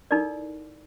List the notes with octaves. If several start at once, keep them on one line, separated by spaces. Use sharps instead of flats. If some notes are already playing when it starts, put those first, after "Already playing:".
D#4 E4 A4 A#4 D5